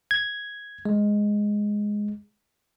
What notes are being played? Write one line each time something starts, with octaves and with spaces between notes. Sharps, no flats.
G#6
G#3